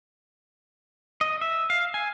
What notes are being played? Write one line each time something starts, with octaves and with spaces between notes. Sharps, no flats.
D#5
E5
F5
G#5